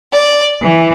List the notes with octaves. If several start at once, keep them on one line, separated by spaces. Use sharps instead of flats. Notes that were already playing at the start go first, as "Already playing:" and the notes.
D5
E3